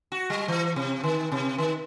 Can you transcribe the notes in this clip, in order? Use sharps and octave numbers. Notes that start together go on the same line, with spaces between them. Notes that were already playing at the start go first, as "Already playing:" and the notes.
F#4
G3
E3
C3
D#3
C3
D#3